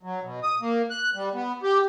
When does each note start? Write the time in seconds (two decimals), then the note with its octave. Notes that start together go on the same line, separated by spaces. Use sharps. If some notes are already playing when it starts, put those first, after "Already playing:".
0.03 F#3
0.23 B2
0.43 D#6
0.61 A#3
0.90 F#6
1.15 G3
1.34 B3
1.63 G4